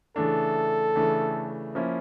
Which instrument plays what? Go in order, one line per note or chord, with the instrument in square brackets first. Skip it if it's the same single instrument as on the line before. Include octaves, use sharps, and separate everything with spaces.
[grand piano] C#3 E3 A3 D4 [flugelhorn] A4
[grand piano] C#3 E3 A3 D4
F3 A#3 C#4 E4